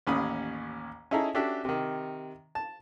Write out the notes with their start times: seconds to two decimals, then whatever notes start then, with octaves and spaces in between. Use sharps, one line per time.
0.07 A1 D#2 C#4 B5 D#6
1.11 C#4 D#4 E4 G#4 A4 A#5
1.34 C#4 D4 F#4 G4 A4 E5
1.65 C3 D#3
2.55 A5